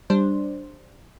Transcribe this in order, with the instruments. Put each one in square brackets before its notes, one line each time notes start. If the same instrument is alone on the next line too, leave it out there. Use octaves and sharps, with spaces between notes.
[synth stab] G3 D4 C5